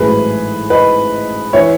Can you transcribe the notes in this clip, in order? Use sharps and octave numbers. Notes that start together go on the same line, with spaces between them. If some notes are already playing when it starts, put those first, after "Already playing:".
Already playing: A1 G#2 F#3 A3 G#4 B4
B4 D#5
E3 C#5 E5